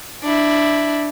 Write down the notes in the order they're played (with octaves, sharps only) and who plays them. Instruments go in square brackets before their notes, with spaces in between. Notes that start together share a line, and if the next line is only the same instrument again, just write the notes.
[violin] D4 E4